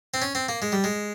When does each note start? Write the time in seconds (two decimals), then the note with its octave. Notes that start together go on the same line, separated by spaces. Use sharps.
0.14 C4
0.22 C#4
0.35 C4
0.49 A#3
0.62 G#3
0.72 G3
0.84 G#3